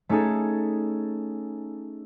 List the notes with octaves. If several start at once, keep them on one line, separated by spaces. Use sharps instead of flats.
A3 C#4 D#4 G#4 A4